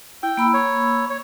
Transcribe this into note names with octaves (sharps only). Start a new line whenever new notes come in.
E4 G5
A#3 B5 E6
C#5
C#5